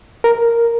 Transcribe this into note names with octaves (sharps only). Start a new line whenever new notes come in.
A#4